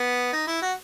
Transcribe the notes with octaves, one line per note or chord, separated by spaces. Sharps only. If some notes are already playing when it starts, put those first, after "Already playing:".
Already playing: B3
D#4
E4
F#4